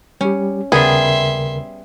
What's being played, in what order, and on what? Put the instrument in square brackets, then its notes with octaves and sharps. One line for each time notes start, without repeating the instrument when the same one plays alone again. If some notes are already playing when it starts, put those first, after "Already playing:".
[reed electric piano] G3 G4 [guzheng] C#4
[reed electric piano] D#2 C#3 A#4 [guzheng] G3 B3 [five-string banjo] G#4 [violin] E5 C6